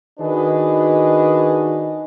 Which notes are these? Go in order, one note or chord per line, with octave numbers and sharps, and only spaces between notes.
D#3 D4 F#4 G#4 B4 D#5